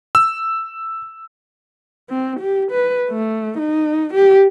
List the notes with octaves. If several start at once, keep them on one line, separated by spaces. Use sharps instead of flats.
E6
C4
G4
B4
A3
D#4
G4